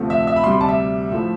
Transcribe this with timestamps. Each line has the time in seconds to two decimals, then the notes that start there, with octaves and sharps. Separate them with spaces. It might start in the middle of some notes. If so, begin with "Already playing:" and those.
Already playing: D2 C3 F3 A3
0.10 E5
0.27 E5
0.36 B5
0.44 D2 C3 G3 C6
0.52 B5
0.61 A5
0.69 E5
1.10 A2 F3 A3